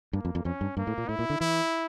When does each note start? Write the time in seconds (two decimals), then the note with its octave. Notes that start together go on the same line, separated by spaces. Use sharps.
0.13 G2 A#3
0.25 F2
0.35 F2
0.45 F2 C#4
0.61 G2
0.77 G2 A#3
0.87 A2
0.98 A#2
1.08 A2 E4
1.19 A#2
1.30 D3
1.40 E3 E4